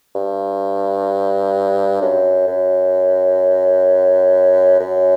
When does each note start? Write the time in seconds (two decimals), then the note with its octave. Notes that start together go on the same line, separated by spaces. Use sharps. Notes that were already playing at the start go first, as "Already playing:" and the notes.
0.15 G2
2.02 F#2
2.47 F#2
4.80 F#2